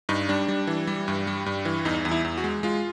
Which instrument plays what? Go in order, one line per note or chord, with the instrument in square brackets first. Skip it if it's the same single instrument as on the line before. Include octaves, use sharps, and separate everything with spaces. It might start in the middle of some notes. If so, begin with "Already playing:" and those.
[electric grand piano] G2 D#4
G3 D4
G3
E3
G3
G2
G3
G2
E3
E2 D#4
E2
E4
E2
F#4
G#3
G#3 F4